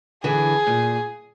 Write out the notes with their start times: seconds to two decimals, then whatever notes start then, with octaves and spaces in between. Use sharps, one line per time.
0.24 D3 E3 G#4
0.67 A#2